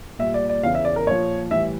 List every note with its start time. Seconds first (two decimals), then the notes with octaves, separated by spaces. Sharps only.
0.19 A#2 G3 E5
0.34 D5
0.49 D5
0.63 E2 C#3 E3 F5
0.75 E5
0.85 D5
0.96 A#4
1.07 A#2 F3 C#5
1.51 A2 E3 G3 E5